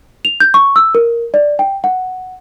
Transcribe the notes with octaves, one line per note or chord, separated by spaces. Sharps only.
F7
G6
C#6
E6
A#4
D5
G5
F#5